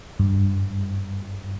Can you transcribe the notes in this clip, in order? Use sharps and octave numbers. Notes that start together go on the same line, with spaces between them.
G2